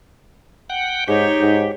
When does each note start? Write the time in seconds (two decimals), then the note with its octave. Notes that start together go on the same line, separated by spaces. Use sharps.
0.70 F#5 G5
1.08 G#2 D#4 G4 C#5
1.41 G#2